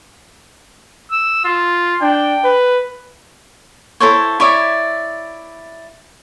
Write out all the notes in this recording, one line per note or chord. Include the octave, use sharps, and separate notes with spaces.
E6
F4
D4 G5
B4
E4 A4 C5 C#5
E4 C#5 D5 E5